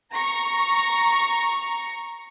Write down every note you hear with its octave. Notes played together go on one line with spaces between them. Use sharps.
A#5 C#6